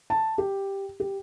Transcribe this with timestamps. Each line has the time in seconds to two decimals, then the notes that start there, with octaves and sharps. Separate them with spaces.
0.10 A5
0.38 G4
1.00 G4